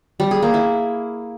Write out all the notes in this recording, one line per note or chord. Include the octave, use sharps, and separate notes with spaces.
G3
G#4
A#3
E4